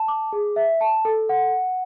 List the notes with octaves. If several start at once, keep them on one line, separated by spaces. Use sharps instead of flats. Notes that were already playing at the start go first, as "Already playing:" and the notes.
Already playing: A5
D6
G#4
E5
A5
A4
F#5